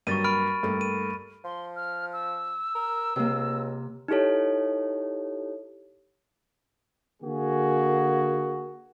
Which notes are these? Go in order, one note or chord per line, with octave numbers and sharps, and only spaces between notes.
G2 F#3 A#3 C#6 A6 D#7
B5 F6 D7
G2 A3 A#3
D#7
F3 C6
F6
E6
A#4
C#2 C3 A#3
D#4 E4 G4 A4 C#5
D3 A#3 F#4 G#4